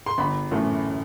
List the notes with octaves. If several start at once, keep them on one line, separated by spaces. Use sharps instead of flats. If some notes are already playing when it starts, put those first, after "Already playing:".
C6
G1 B5
F#2 E3 A3